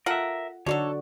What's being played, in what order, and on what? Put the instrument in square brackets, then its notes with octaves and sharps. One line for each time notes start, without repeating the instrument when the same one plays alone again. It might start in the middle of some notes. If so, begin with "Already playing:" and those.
[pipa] F4 A4 F#5 [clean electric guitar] A#4 E5
[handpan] D3 F#4 D5 [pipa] D4 D#4 A4 [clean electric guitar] C#5